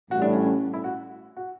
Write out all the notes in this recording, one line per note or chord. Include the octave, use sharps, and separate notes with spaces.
A1 A2 G3 F#4
D4
C#4
C#4
E4
F#4
F#4